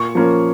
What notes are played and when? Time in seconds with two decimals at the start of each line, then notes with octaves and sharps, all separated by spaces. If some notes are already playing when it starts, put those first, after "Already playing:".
Already playing: A#2 C#6
0.15 F3 A#3 C#4